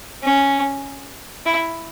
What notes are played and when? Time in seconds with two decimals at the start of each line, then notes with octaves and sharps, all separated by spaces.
0.23 C#4
1.46 E4